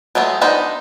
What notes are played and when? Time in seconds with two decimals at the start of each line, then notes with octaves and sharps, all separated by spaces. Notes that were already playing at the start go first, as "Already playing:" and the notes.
0.15 F#3 G#3 A3 B3
0.41 B3 D4 D#4 B4 C5